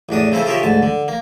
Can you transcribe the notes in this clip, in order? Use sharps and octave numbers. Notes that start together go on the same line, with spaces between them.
A1 E2 D4 D#6
C#3 C4 E4 A4 A5
F4 G4 G#4 A#4 C#5 E5
D2 G#2 A5
D3
A#3